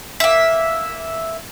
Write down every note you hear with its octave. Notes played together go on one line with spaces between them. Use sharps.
A#3 E5